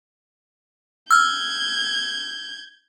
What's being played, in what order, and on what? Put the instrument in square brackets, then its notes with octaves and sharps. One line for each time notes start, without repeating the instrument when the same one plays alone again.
[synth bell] E6 F6 [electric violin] G6 G#6